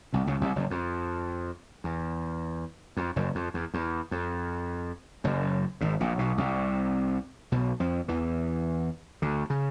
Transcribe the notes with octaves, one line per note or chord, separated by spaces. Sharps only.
C2 C3
C#2 C#3
C2 C3
F#1 F#2
F2
E2
F2
F#1 F#2
F2
E2
E2
F2
F#1 F#2
G#1 G#2
A#1 A#2
B1 B2
C2 C3
B1 B2
F2 F3
E2 E3
D2 D3
C#3